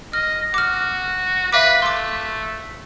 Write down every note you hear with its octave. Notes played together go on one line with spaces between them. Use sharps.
D#5 F6
F#4 D6 F6
B4 E5 F5 D6
A3 C6 D6